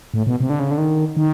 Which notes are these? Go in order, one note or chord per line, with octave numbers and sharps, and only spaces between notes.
A2
B2
C3
D3
C#3
D3
D#3
D#3